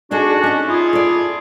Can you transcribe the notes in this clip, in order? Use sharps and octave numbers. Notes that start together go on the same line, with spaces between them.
D4 D#4 F#4 G#4 A4
C#4 D#4
E4 F4 G#4
A4 D5